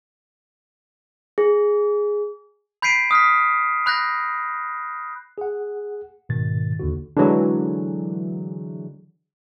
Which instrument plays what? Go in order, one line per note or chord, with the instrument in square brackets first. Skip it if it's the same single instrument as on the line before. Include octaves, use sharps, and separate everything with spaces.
[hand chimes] G#4
[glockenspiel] B5 G6 B6 C7 D7 D#7
D#6 F6 G6 B6
B5 F#6 G6 A#6
[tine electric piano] G#4 F#5
G#2 B2 D#3 A6
D#2 D3 F#4
[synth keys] D3 E3 F#3 G#3